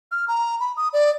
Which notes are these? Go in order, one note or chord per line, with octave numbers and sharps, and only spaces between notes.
F6
A#5
B5
D#6
D5